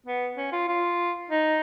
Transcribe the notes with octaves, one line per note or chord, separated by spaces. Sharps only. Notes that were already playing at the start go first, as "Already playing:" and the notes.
B3
C#4
F4
F4
D#4